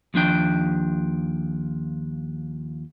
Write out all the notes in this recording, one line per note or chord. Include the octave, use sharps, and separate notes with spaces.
D#2 F3 D4 G5